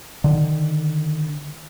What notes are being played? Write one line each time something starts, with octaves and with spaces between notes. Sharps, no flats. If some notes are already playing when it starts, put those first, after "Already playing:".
D3 D#3